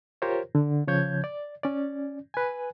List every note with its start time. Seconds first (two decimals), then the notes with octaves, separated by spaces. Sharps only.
0.22 F4 G4 A#4 C5 C#5
0.55 D3
0.87 C#3 F3 C#5 G6 G#6
1.24 D5
1.64 C#4 D5
2.34 B4 G#5